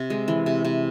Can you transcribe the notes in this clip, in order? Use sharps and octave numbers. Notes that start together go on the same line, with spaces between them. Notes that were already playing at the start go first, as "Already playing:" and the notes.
Already playing: C3
G#3
E3
C3
C3